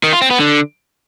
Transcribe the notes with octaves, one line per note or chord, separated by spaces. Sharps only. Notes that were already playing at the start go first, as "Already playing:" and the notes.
D#3
F4
C4
B3
D3